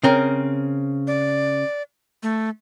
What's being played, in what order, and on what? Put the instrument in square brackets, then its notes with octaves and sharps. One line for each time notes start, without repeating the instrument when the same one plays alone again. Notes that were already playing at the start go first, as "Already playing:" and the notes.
[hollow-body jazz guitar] C#3 C4 A#4
[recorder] D5
A3